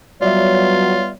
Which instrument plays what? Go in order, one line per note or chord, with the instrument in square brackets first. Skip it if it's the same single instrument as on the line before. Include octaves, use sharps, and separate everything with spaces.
[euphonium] F#3 [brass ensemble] G3 B3 C#5 [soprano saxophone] F4 [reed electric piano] D5 E5